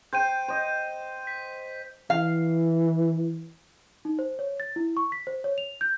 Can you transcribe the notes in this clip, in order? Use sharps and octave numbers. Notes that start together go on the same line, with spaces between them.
C5 G5 G6 D#7
C5 D#5
B6
E3 F5
D#4
C5
C#5
A6
E4
C#6
B6
C5
C#5
F7
G6